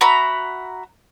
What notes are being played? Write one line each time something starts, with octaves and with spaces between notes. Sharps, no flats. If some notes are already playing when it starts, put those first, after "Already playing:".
F#4 E5 A#5 B5